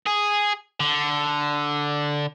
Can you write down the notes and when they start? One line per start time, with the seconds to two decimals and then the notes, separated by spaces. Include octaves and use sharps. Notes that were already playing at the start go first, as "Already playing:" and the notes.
0.06 G#4
0.80 D3